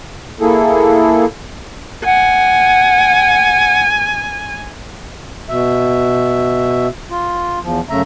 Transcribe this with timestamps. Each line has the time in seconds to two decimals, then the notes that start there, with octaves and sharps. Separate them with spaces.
0.41 A#3 E4 G#4 A4
2.05 F#5 G#5
5.49 B2 E5
7.10 F4
7.62 E2 F3
7.90 F#2 C#3 A3 E5 A#5